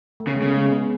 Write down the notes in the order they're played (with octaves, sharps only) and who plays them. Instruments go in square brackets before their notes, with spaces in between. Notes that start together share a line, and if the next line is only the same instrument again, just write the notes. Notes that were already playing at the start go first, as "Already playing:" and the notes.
[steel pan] A3
[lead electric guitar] C#3 [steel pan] B3
[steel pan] G#3
[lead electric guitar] C#3 [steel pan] A3
[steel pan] G#3
C#4
B3